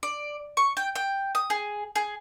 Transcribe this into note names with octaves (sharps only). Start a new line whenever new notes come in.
D5
C#6
G5
G5
D#6
G#4
G#4